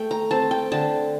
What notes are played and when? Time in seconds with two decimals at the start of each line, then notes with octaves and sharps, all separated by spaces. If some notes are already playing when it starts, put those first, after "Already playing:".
Already playing: A3 G5
0.11 A#5
0.31 C4 A5
0.51 G5
0.72 D3 A5